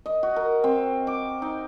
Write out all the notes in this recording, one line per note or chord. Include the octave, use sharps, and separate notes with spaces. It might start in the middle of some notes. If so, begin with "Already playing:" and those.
D#5
F#4
A#4
C4
D6
D#4